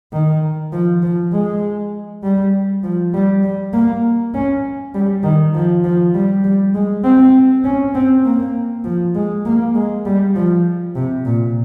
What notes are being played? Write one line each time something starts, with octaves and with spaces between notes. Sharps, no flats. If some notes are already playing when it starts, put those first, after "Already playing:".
D#3
F3
F3
G#3
G3
F3
G3
G3
A#3
C#4
G3
D#3
F3
F3
G3
G3
G#3
C4
C#4
C4
A#3
F3
G#3
A#3
G#3
G3
F3
C3
A#2